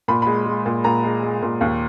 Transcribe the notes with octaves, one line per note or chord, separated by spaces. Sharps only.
A#2 B5
G#3 B5
G#3
A#2
A#2 A#5
G#3
G#3
A#2
D#2